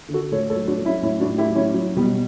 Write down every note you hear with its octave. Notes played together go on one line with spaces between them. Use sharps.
D3
F#4 A4
A2 A4 C#5
A4 C#5
F#3
D4 F#4
F#3
C#4 E4
A2 C#4 E4
D4 F#4
A2
E4 G4
F#3
C#4 E4
F#3
B2 G3 B3